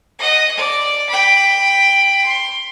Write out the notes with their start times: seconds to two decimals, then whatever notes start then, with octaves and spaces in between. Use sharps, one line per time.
0.19 D#5 F#5
0.57 D5
1.09 G5 B5
2.24 C6